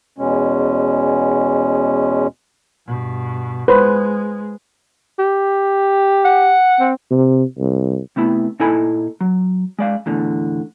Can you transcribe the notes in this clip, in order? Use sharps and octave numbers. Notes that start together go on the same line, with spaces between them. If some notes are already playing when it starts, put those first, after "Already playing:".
E2 B2 G#3 C#4
G2 B2
G#3 B4 C5
G4
F#5
C4
C3
C2
C3 A3 B3 E4
A#2 D#4 E4 A4 G#5 B5
F#3
G#3 D5 F5
E2 A2 D3